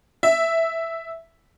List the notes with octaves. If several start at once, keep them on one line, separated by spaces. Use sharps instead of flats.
E5